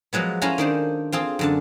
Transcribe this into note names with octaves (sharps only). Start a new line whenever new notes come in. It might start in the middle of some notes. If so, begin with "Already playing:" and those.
F3 F#3 G#3 B3
C#4 E4 F4 A4 G#5 A#5
D#3 D4 C5
C4 F4 G#4 A4
F#2 D3 A5